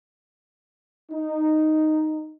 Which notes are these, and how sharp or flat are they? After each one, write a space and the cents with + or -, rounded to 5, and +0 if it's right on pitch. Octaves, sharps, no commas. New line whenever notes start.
D#4 -5